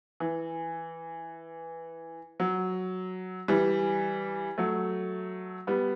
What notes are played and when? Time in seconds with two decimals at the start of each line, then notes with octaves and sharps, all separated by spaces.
0.20 E3
2.40 F#3
3.48 E3 G3
4.58 F#3 A3
5.67 G3 B3